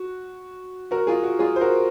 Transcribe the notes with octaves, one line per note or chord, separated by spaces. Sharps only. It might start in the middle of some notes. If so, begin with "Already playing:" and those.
Already playing: F#4
F#4 A#4
F4 G#4
F#4
F4 G#4
C5
F#4 A#4